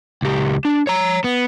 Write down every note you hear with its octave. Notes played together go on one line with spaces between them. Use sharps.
C#2 G4
D4
C#5 A#5
B3